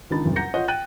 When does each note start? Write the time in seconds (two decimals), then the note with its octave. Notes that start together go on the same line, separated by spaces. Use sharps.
0.10 C#2 D#3 D4 D#4 B5 A6
0.25 F#1 C2
0.36 F#5 A#5 G6 A#6 C#7
0.54 F4 C#5 D#5 F#5
0.68 G5 F#6 A6 D#7